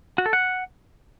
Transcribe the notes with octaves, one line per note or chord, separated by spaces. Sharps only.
F#4
A4
F#5